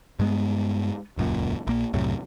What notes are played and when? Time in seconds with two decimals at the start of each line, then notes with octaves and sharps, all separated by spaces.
0.19 G2 G#3 B3
1.17 D#1 C#2 F#2 A#2
1.67 A#1 A#3
1.93 C2 F#2 A2 C3